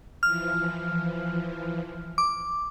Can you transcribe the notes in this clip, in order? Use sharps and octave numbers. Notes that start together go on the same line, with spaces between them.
E3 F3 F6
D6